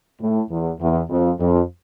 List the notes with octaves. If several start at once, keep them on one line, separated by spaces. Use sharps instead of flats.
A2
E2
E2
F2
F2